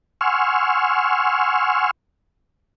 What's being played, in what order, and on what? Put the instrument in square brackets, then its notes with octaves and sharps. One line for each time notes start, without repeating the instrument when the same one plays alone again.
[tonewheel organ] F#5 G#5 C6 C#6 E6 F6